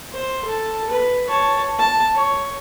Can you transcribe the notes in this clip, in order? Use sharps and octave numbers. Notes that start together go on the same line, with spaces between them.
C5
A4 A5
B4
C#5 A5
A5
C#5